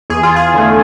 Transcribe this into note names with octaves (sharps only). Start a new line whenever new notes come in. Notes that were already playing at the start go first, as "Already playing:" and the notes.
E2 G#4
F4
G#4
D3 A3